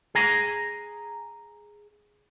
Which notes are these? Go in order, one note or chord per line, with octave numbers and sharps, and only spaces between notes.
G#4 G#5 A#5